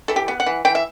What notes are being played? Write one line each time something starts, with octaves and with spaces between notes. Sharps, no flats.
E3 A4
G4
B3
F#5
E3
E3 G5
E5